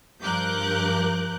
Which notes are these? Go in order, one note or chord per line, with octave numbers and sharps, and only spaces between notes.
G2 F3 A#4 D6 F#6 G6